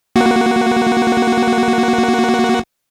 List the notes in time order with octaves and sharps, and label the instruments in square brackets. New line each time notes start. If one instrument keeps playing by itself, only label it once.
[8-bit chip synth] A#3 F#4 F#5